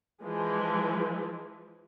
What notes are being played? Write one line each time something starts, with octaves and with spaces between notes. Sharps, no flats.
E3 F3 G#3